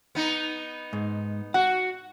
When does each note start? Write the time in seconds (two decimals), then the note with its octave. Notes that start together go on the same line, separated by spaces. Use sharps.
0.15 B3 D#4
0.93 G#2
1.54 F#4 F#5